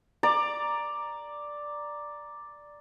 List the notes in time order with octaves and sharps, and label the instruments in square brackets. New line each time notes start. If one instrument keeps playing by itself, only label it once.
[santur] D5 A#5 D6